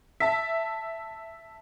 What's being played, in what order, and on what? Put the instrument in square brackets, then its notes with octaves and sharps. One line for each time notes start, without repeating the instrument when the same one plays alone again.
[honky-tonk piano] E5 A5